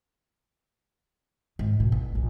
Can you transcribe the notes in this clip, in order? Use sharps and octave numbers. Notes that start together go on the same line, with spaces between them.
G#2
B2
A1
A#1